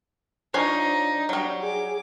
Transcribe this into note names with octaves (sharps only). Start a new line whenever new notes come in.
F3 D4 D#4 C#5 G#5
F#3 G3
G#4 D6